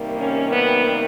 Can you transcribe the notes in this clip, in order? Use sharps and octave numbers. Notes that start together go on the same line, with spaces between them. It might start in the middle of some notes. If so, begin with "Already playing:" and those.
Already playing: C3 D#3 G3 A#3
C#4
B3